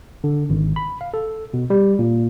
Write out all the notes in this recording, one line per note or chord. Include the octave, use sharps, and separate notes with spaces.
D3
G#1
B5
F5
A4
B2
G3
A#2